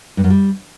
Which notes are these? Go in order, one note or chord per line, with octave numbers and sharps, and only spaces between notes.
G2
F#2
G3